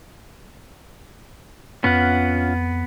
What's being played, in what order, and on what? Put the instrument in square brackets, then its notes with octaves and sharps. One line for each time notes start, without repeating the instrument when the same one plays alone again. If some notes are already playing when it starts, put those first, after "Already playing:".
[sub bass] F2 [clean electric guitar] B3 [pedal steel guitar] C#4 F4 F#5